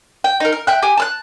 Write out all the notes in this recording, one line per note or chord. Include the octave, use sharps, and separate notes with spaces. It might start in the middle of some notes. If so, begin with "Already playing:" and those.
G5
D#4 A#4
A#4
E5 G5 F#6
G4 G#5
A5 F6 F#6